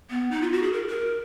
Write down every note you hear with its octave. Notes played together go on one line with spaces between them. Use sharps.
B3
D#4
F4
F#4
G#4
A#4
A#4